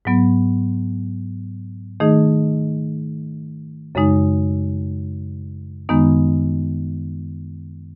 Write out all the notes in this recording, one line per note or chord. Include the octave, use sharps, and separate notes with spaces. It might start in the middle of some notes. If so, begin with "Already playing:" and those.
G#2 F#3 B3
D#3 A3 D#4 G#4 D#5
F#2 C#3 G#3 D#4
F#2 D#3 G#3 B3 D#4